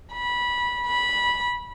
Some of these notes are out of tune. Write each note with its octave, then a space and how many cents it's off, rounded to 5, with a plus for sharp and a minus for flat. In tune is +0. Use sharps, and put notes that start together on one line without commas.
B5 -20
B5 -15